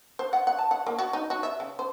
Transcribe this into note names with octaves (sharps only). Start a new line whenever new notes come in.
C5
F#5
F#5
A5
F#5
A#3
F#4
D#4
F#4
E5
C#3
C5